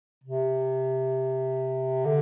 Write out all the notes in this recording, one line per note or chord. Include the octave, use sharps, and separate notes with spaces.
C3
D3